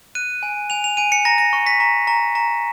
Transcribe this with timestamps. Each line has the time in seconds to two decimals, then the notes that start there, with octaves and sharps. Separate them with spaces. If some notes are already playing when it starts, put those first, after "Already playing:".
0.15 F#6 D#7
0.43 G#5
0.70 G#5 F7
0.84 F7
0.97 G#5 D#7
1.12 C#7
1.25 A#5 A#6
1.38 A#6
1.53 C#6
1.67 B6
1.80 A#5
2.07 A#5
2.35 A#5